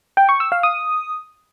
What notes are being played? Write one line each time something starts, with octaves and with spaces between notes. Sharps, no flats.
G5
C#6
E6
F5
D#6